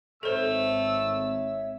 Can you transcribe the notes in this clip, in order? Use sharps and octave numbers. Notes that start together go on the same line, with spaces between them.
G#1 A3 A4 C5 C#5 E5 E6